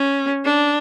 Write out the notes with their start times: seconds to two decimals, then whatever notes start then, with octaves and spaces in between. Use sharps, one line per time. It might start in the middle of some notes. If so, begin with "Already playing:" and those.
Already playing: C#4
0.44 D4